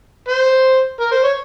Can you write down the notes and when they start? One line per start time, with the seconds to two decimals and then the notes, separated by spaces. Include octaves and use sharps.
0.28 C5
1.00 A#4
1.11 C5
1.24 C#5